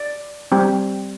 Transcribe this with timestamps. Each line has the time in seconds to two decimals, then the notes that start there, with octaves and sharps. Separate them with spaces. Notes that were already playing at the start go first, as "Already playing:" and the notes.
Already playing: D5
0.52 G3 C4 G4